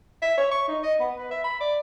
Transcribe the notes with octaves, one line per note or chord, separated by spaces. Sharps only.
E5
C#5
C#6
D#4
D#5
B3
B4
E5
B5
D5